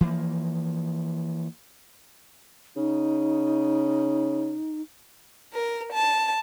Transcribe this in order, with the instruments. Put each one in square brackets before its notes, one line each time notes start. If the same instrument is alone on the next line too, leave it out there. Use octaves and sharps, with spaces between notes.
[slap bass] E3 F3 A3 A#3
[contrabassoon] C#3 [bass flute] D#4
[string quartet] A#4
A5